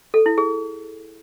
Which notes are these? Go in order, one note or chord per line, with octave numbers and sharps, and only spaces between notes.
A4
E4
G#4